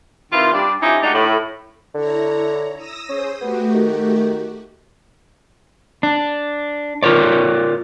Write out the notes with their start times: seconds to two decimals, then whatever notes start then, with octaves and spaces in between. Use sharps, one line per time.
0.33 C3 D#3 E3 F4
0.52 G3 D4 D5
0.82 F3 C#4 D#4 E4 G4
1.02 G#3 A3 D4 D#4 F#4 G4
1.14 A2
1.95 D3 E4 C#5 A#5
2.76 D#6 E6 A#6
3.09 C#4 G#4 C5 D#6
3.41 A3 B3 F#4 G4
3.74 D#3
6.03 D4
7.03 F4 A#4 C#5 D5